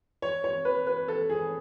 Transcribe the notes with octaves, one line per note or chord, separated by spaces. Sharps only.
C#5
C#5
B4
B4
A4
G#4